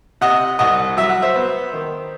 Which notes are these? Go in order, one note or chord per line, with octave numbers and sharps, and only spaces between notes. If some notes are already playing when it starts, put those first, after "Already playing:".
C3 D#5 F#5
C2 D#5 F#5
F#3 E5
F#5
C5 E5
B3
D#3